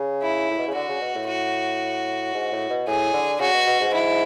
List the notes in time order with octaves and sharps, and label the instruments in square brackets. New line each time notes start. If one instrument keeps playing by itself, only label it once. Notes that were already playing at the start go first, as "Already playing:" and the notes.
Already playing: [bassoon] C#3
[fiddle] E4
[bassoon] A2
B2
C#3
[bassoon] D3 [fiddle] F#4
[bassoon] C#3
B2
A2
[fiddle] F#4
[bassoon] G#2
A2
B2
[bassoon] A2 [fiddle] G#4
[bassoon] D3
[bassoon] C#3 [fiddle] F#4
[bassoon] B2
B2
G#2
[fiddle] E4